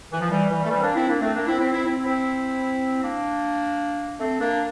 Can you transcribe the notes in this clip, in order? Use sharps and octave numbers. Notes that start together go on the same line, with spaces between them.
E3
F3
E3 G3
E3 G3
A3
E3 G3
C4
A#3 D4
C4 E4
A#3 D4
A3 C4
A#3 D4
C4 E4
C4 E4
C4 E4
C4 E4
C4 E4
A#3 D4
A3 C4
A#3 D4